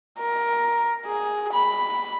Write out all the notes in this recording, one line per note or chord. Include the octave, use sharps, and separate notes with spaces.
A#4
G#4
B5